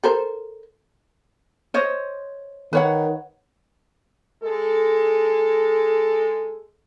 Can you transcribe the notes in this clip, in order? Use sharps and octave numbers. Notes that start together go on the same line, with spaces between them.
A4 A#4 C5
C5 C#5 D#5
D#3 B4 C#5 F#5
G#3 A4